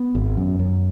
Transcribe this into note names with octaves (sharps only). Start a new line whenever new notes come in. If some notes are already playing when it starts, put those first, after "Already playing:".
Already playing: B3
G#1
F#2
F#2